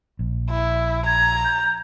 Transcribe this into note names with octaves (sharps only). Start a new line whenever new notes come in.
A#1
E4
A#5 G#6
G6